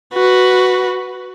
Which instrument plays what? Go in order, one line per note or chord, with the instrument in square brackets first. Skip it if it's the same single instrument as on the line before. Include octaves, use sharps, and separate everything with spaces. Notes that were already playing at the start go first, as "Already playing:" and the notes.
[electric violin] F#4 B4